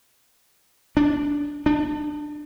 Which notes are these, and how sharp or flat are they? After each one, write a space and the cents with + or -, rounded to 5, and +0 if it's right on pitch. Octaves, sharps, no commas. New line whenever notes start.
D4 -15
D4 +20